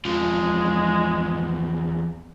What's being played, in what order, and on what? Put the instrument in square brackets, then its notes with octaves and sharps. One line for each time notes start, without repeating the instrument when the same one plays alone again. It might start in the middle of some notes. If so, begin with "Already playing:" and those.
[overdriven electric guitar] E2 F3 [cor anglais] G#3